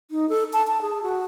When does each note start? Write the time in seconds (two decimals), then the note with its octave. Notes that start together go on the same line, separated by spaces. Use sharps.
0.11 D#4
0.29 A4
0.53 A5
0.67 A5
0.82 G#4
1.03 F#4